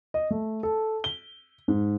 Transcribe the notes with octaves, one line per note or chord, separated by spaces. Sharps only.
D#5
A3
A4
G7
G#2